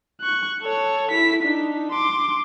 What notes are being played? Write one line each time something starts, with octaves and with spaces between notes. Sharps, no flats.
C#6 F#6
A4 C#5
E4 B6
D4 D#4
C6 D6